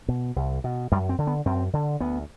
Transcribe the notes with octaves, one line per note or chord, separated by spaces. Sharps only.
B2
C2
B2
F#2 G3
C4
D3
B3
F#2 C4
D3
D2 B3